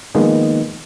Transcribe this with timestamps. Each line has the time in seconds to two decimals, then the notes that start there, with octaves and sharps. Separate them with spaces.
0.15 D#3 F3 G#3 A#3 B3 D#4